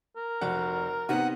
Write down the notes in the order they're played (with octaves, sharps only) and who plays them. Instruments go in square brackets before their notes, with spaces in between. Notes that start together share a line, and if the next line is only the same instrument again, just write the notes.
[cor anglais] A#4
[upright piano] F1 F#4 F#5 [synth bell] D5
[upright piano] C3 B3 [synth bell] D#4 [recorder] F#5